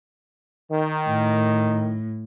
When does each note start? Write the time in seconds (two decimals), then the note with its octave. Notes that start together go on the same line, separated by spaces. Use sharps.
0.71 D#3
1.08 A2